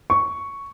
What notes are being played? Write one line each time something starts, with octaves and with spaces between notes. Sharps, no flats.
C#6